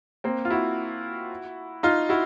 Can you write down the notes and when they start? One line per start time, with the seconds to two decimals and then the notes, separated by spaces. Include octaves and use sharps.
0.24 A#3 C4
0.45 F4
0.50 E4 F#4
1.83 D#4 F4
2.09 E4 F#4